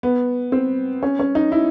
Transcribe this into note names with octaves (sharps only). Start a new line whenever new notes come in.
B3
C4
C#4
C#4
D#4
E4